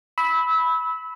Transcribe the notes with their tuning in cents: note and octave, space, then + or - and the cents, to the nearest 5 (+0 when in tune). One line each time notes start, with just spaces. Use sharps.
B5 +0 E6 -25